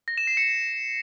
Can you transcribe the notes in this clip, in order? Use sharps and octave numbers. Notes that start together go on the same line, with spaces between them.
A#6
E7
C7
C#7